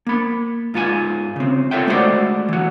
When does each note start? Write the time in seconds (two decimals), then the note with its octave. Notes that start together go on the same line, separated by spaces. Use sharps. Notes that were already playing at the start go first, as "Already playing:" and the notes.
0.07 A#3 B5
0.74 G#2 F4 A4 G#5
1.36 C#3 C4
1.71 F4 A4 C#5 E5 G5
1.87 G#3 A3 B3 F#4 C5 D5
2.48 E3 F#4